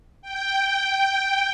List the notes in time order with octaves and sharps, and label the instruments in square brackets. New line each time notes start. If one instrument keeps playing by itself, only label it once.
[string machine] G5